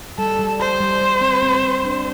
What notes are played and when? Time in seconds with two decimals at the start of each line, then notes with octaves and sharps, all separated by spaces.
0.18 G3 A4
0.39 G3
0.60 G4 C5
0.80 G3
1.01 G3
1.21 C4
1.43 C4
1.64 C4
1.85 D4